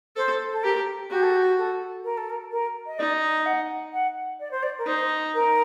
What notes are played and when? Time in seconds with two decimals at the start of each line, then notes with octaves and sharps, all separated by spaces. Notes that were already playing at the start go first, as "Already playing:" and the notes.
0.16 A4 C5
0.52 A4
0.63 G4 A#4
1.10 F#4 G4
1.23 A4
1.35 G4
1.58 A4
2.04 A#4
2.17 A4
2.30 A#4
2.52 A#4
2.86 D#5
2.98 D#4 D5
3.39 D#5
3.46 F#5
3.93 F#5
4.40 D5
4.51 C5
4.63 D5
4.78 A#4
4.86 D#4 C5
5.34 A#4